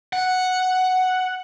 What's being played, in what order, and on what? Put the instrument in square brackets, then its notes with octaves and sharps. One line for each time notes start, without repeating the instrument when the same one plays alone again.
[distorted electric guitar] F#5